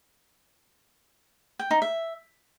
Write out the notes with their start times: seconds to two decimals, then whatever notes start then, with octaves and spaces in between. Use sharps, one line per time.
1.59 G5
1.71 D#4
1.82 E5